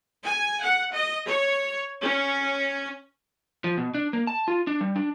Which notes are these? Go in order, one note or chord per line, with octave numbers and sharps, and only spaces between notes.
G#5
F#5
D#5
C#5
C#4
F3
B2
D4
A#3
A5
F4
D4
G3
D4